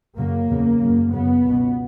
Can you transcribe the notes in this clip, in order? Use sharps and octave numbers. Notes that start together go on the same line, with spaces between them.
F#2 C#3 A#3
E2 C#3
F#2 C#3
F#2 C#3 B3
C#2 B2